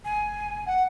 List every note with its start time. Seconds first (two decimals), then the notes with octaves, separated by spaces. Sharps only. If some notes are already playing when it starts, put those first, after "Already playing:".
0.05 F1 G#5
0.67 F#5